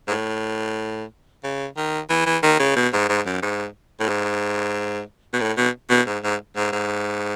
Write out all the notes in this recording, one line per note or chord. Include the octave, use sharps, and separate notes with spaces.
G#2
A2
C#3
D#3
E3
E3
D#3
C#3
B2
G#2
G#2
F#2
G#2
A2
G#2
B2
A2
B2
B2
G#2
G#2
G#2
G#2